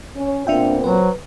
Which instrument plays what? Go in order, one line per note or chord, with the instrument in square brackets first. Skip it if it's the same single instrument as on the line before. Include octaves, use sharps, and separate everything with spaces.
[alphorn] C#4 [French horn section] C#5
[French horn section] A#2 B3 C4 [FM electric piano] D4 E5 G5 [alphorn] F4
[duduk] F#3 [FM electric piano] B4 [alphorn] C5